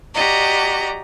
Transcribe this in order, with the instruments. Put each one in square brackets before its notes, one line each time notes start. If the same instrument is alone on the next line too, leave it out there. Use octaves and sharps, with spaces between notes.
[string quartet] F#4 G4 D5 D#5 A#5